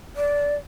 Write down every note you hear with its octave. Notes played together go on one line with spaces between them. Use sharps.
D5